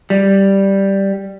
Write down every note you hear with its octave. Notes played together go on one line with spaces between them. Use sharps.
G3